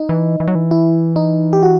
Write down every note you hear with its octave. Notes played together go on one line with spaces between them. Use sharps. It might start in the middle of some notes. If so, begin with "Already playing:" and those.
Already playing: D#4
E3
E3
F#3
E3
E4
D#4
G4
F#4